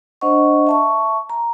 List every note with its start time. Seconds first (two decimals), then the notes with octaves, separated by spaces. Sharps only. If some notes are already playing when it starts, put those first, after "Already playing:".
0.21 D4 C5 D#5 F#5 C#6
0.67 E5 A5 C#6
1.30 A#5